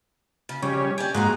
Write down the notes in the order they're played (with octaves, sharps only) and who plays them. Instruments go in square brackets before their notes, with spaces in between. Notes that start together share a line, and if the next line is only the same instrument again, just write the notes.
[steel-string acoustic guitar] C#3
[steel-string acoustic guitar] F2 [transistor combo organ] C#3 G3 C#4
[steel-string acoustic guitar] G4 D5 [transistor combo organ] G#5
[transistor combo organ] G#2 G#3 F#4 [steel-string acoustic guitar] A#3 G#5 A#5